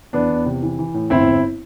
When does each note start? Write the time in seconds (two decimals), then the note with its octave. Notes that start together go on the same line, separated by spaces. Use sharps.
0.13 E2 B3 D4
0.30 E2
0.46 C3
0.63 E3
0.79 E3
0.94 A2
1.10 G1 C4 E4
1.27 G1